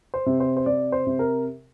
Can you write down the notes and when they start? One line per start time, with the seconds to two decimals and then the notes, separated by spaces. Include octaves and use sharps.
0.14 C5
0.26 C3
0.40 C5
0.57 C5
0.66 C3 D5
0.92 C5
1.07 C3
1.19 A#4